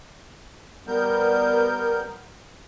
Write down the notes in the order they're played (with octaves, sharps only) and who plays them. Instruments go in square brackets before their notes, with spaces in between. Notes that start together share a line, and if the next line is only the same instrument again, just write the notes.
[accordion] G3 B3 A#4 G6